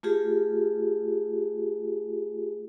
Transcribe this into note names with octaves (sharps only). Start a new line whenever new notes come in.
A3 F4 G4 G#4